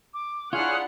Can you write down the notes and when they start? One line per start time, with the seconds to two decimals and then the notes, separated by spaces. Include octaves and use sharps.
0.14 D6
0.53 D4 E4 F4 G#4 C#5 F#5 F6